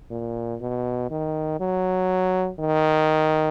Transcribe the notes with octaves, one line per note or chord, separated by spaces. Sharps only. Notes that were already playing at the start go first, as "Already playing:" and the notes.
A#2
B2
D#3
F#3
D#3